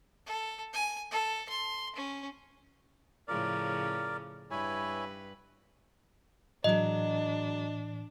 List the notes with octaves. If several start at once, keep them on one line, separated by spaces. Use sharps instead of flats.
A4
G#5
A4
C6
C#4
A2 C#3 F3 A#4 D5
G2 E4 B4 C#5 G#5
A2 E3 F#3 G#3 D4 D#5